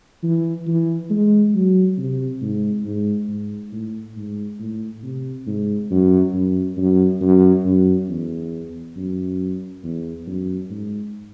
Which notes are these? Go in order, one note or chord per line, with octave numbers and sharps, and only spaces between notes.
E3
E3
G#3
F#3
C3
G#2
G#2
G#2
A2
G#2
A2
C3
G#2
F#2
F#2
F#2
F#2
F#2
E2
F#2
E2
F#2
G#2